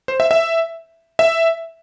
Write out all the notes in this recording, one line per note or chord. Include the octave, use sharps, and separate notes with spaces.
C5
E5
E5
E5